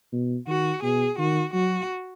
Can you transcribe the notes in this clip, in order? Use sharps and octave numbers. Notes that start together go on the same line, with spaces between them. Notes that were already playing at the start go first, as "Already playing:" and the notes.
B2
D#3 F#4
B2 G#4
D#3 F#4
F#3 F#4